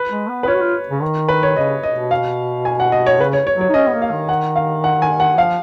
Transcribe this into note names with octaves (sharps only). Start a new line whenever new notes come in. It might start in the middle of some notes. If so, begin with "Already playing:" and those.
Already playing: B4
G#3
B3
B4
F4 C#5
F#4
F4
C#3
D#3
B4
C#5
C#3 D#5
D#5
B2
F5
G#5
F#5
D#5
C#5
C#3 B4
C#5
C#5
F#3 C#5
D#4
C#4 D#5
B3
A#3
F5
D#3
F#5
F5
F#5
G#5
F#5
F3 F5